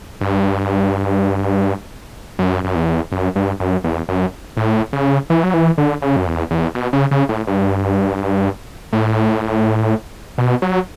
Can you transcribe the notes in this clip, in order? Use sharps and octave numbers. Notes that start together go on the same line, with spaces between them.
G2
F#2
F#2
E2
F#2
G2
F#2
E2
F#2
A2
C#3
E3
F#3
E3
D3
C#3
F#2
E2
E2
B2
C#3
C#3
A2
G2
A2
B2
F#3